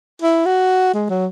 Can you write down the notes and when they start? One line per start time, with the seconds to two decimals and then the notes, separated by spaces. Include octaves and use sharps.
0.22 E4
0.45 F#4
0.94 G#3
1.09 F#3